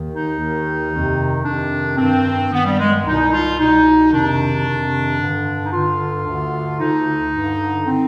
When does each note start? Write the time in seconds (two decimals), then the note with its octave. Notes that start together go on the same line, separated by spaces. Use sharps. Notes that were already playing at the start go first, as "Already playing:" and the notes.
Already playing: D#2 D#3
0.11 D#4
0.38 D#2 D#3
0.91 F2 C3 D#3
1.45 F2 C3 D#3 D4
1.98 G2 D#3 C4
2.52 G2 D#3 B3
2.65 G3
2.78 G#3
3.05 C2 B2 D#4
3.31 F4
3.59 C2 B2 D#4
4.12 F2 C3 D#3 D4
4.66 F2 C3 D#3
5.19 G2 D3
5.65 D#4
5.72 G2 D3 F4
6.26 D2 D3
6.80 D2 D3 D#4
7.33 G2 D3
7.87 C4
7.92 D3